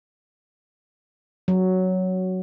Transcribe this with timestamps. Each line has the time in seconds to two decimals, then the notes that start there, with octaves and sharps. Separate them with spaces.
1.48 F#3